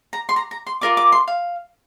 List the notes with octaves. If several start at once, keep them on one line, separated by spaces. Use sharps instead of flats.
A#5
C6
A#5
A#5
C6
F4 A#4 D5 D6
D6
C6
F5